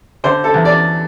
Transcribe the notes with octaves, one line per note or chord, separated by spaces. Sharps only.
D3 C5
A4
E2
D5